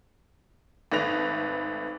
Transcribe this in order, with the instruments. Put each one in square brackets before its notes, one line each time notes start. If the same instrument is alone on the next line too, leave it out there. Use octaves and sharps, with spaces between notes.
[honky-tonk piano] G#1 A3 B4 A#6 F7